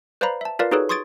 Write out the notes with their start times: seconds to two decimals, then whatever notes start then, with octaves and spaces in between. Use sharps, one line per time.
0.21 B4 C5 D5 F5 A#5 B5
0.41 E5 A5
0.59 F4 A#4 B4 D5 F5
0.71 D#4 F#4 G#4 A4 B4 C#5
0.89 C6 C#6 D#6 G#6 A6 D7